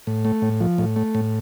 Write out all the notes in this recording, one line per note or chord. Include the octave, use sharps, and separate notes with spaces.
A2
A3
A2
F3
A2
A3
A2